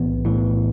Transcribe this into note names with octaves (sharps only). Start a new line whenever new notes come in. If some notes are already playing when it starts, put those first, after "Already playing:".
Already playing: B1 A2 E3 B3
A2 E3